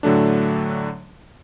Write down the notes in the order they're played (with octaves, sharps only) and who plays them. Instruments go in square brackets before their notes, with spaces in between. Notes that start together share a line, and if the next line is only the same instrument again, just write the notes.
[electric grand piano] A2 D3 F#3 A3 D4